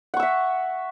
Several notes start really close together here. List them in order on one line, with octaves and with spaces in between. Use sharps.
F#5 C#6 E6 E5